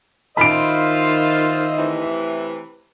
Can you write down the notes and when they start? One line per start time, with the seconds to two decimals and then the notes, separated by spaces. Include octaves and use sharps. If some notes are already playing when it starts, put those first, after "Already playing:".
0.37 D#3 F4 C5 D#5 E5 B5 D7
1.76 A2 C3 E3